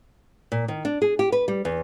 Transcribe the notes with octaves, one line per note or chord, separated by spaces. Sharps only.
A#2
D#3
D4
G#4
G4
B4
G3
E2